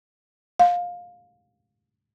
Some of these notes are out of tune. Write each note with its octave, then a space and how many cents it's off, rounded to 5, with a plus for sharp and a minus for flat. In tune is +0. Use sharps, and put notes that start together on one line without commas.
F5 +20